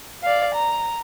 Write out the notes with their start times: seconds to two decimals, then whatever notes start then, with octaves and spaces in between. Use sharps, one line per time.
0.23 D5 F5
0.54 A#5